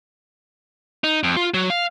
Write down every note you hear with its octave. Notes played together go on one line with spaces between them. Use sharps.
D#4
F2
F4
F#3
F5